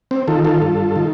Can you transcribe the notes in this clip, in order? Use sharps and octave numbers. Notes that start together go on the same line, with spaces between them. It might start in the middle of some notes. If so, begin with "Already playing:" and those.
C4
D#3 F4 A4
F4 A4
G2
D#3